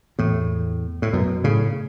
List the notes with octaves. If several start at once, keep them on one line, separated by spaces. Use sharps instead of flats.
E2 A2
A2
F#2 B2
A2 C#3